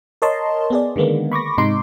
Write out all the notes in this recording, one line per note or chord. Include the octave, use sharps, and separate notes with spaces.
A#4 C#5 D#5 A5 C6
B3 G#4 D5
D3 D#3 G#3 A#3 B3
B5 C#6 D6 A#6
G#2 C3 D#4 A#5 C6 D6